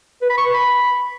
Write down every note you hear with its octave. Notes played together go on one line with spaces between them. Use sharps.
B4
B5
C#6
B4
B5